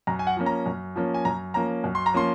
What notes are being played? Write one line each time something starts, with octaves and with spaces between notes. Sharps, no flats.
F#2 A#5
G#5
F#5
F3 A#3 C#4
A#5
F#2
F3 A#3 C#4
G#5
F#2 A#5
F3 A#3 C#4 A#5
F#2
C6
A#5
F3 A#3 C#4 C6